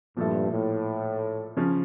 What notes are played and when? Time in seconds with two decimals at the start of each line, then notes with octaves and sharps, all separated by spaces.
0.17 G2 A#2 F3 A3 E4 A4
0.52 A2
1.57 C#3 F3 C#4